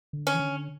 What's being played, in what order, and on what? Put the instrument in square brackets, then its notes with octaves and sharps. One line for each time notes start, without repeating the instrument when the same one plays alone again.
[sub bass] D3
[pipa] C#4
[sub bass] E3
D3